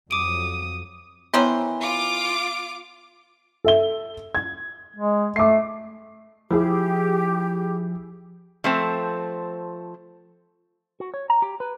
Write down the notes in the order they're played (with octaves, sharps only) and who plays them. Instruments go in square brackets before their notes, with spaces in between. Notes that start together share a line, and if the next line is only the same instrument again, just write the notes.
[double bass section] F2 F#3 [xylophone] D6 D7 [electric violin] D#6
[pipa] D#3 E3 C5 [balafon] B3 C#5 E5
[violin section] F4 D6
[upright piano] A4 E5 G7
G#6
[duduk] G#3
[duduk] A3 [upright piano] D6 C7
[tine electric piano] F3 [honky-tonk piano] E4 G#4 [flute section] G4
[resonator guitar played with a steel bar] F3 A3 C4
[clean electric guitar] F#4
C#5
A#5
G4
B4